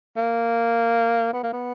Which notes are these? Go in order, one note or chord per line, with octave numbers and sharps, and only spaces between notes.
A#3
B3
A#3
B3